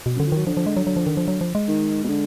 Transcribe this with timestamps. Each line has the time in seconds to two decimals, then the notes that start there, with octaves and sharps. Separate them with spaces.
0.06 B2
0.15 F#2
0.20 D3
0.26 F3
0.32 D#3 F#3
0.46 D3 F3
0.57 F3
0.66 G#3
0.77 F#3
0.87 F#3
0.97 F3
1.07 D#3
1.17 F3
1.28 F#3
1.41 F3
1.55 G#3
1.68 D#3
2.04 B2
2.08 D3